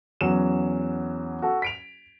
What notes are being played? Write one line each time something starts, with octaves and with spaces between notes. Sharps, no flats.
E2 F#3 C#4 E7
F#4 A4
B6 D7 F7